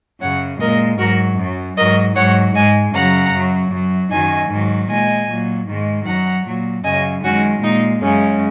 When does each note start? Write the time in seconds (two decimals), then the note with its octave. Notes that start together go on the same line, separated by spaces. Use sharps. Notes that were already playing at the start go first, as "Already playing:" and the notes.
0.21 F#2 C#3 F#3 C#5 F#5
0.60 A#2 G#3 A#4 D#5
0.98 G#2 F#3 F#4 A#4
1.37 F#2 F#3
1.77 G#2 F#3 A#4 D#5
2.16 G#2 F#3 C#5 F#5
2.55 G#2 G#3 D#5 G#5
2.94 F#2 C#3 F#3 F#5 A#5
3.33 F#2
3.38 F#3
3.72 F#2 F#3
4.11 F#2 D#3 F#3 D#5 G#5
4.50 G#2 D#3 F#3
4.89 A#2 G#3 D#5 G#5
5.28 A#2 F#3
5.68 G#2 D#3 G#3
6.06 F#2 F#3 F#5 A#5
6.45 A#2 F#3
6.84 F#2 C#3 F#3 D#5 G#5
7.24 F#2 D#3 G#3 C#4 F#4
7.62 A#2 G#3 D#4
8.01 F#2 C#3 G#3 C#4